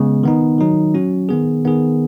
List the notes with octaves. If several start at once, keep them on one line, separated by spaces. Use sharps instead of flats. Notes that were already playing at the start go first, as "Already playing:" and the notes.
Already playing: C#3 G#3 B3
D#3 B3 D#4
D#3 F#3 D#4
F#3 C#4 F#4
D#3 B3 G#4
D#3 B3 G#4